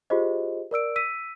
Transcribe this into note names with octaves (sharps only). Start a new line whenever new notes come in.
F4 G4 G#4 C5 D#5
A#4 D5 E6 D7
E6 B6 D#7